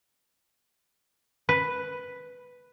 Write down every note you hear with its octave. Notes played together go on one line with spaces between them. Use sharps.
B4